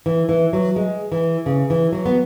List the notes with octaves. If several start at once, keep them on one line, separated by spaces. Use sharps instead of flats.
E3
E3
F#3
G#3
E3
C#3
E3
F#3
B3